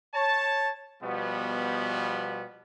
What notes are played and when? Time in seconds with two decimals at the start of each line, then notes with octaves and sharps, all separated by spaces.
0.14 C#5 A5
1.03 B2 F3 G3 B3